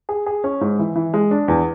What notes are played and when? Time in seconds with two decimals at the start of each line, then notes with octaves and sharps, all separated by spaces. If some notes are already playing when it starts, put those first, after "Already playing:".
0.09 G#4
0.26 G#4
0.44 C#4
0.61 G#2
0.79 E3
0.95 E3
1.14 G#3
1.31 D4
1.48 E2